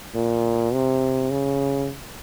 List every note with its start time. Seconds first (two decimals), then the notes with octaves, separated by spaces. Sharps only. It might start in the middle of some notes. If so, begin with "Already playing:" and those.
0.15 A#2
0.73 C3
1.30 C#3